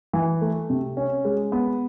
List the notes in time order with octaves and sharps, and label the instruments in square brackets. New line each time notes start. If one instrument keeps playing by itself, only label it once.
[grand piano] E3
A3
C3
C#4
G#3
B3